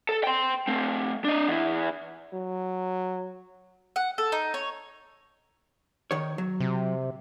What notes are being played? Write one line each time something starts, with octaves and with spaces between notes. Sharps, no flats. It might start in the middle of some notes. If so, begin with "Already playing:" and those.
A4
G5 C6
A3 C4
D4 D#5
E2 E4
F#3
F#5
A4
D#4
C#5
D#3 C#5
F#3
C3